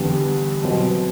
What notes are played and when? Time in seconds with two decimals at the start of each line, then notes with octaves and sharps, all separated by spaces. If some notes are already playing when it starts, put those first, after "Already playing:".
Already playing: E2 D3 G3
0.63 B2 F#3 C4